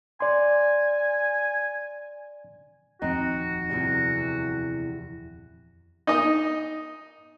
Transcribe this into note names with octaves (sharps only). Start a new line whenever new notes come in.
D5 G#5 C6
D#1 F2 C4 D#4 F#4
E2 C3 G3
D#4 D#5